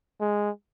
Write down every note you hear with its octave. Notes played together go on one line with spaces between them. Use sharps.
G#3